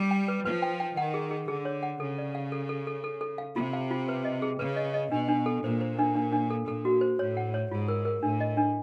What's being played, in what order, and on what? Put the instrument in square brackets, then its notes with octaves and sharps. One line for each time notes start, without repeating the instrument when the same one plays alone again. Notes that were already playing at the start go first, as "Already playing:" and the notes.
Already playing: [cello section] G3
[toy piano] G5
B4
[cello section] F3 [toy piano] B4
[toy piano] G5
G5
[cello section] D#3 [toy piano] F#5
[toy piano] G#4
G#4
[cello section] D3 [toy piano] G#4
[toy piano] C#5
F#5
[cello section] C#3 [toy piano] A4
[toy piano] D5
F5
A4
A4
A4
A4
A4
F5
[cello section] C3 [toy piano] F4
[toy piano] F5
F4
B4
D#5
G#4
[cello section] C#3 [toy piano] B4
[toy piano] D#5
D#5
[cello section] B2 [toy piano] D4
[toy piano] D4
A4
[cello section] A#2 [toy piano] C5
[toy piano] C5
D4
D4
D4
A4
[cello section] A#2 [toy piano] A4
[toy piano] F#4
C5
[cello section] A2 [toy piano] C#5
[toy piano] F#5
C#5
[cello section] G#2 [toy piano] F4
[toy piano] A#4
A#4
[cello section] A2 [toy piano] D4
[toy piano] D#5
D4